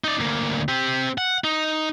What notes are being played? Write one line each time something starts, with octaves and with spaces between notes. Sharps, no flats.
D#4 D5
D2 A#3
C4 G4
F#5
D#4